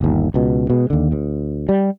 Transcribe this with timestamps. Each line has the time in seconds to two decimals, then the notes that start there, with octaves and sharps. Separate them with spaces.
0.01 G1 D#2
0.34 C#2 B2
0.70 B2 G#3
0.90 D#2 D3
1.12 D2
1.69 G3